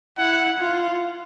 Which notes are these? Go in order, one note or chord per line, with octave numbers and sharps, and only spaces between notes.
E4 F#5
F4